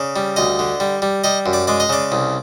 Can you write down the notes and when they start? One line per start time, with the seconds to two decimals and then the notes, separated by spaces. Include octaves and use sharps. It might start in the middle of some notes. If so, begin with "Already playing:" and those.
Already playing: C#3 D5
0.16 G3
0.36 D2 D#5
0.59 D3
0.80 G3
1.02 G3
1.24 G3 D#5
1.46 F#2
1.53 D5
1.67 G#3 D5
1.80 D#5
1.89 C#3 D5
2.12 C2